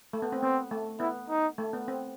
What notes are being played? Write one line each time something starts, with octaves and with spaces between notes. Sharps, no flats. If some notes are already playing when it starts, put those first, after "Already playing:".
A3
B3
C4
B3 C4
A3
B3 E4
D#4
A3
B3
C4